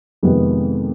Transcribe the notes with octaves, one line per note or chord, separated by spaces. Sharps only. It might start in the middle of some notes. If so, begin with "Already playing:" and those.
F2 C3 D#3 G#3 B3